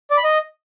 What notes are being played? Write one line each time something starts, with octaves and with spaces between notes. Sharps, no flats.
D5
B5
D#5